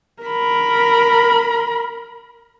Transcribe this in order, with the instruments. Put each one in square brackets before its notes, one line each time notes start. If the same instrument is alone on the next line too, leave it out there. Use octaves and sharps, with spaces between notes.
[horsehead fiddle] A#4 B5